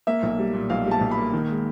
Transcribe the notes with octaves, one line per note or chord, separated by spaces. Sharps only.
A#3 E5
B1
G3
A#2
B1 F5
G3
A5
B1
B5
A#3
D#3
G#3